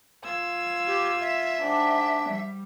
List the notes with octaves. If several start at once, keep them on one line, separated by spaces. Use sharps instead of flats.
F4 E6 G#6
G4
E5
G#2 D4 G5
G3